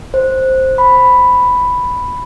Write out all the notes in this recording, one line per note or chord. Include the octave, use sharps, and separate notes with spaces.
C5
B5